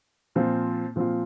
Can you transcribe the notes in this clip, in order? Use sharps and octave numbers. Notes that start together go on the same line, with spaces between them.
A#2 F3 C4 F4
A#2 F3 C4 F4